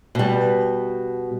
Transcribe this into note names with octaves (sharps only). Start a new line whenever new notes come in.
B2 G3